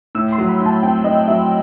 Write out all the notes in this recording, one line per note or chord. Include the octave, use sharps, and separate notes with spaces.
A2 E6
C6
F#3
B5
A2
A5
C4 G5
A2 D#5
F#3 E5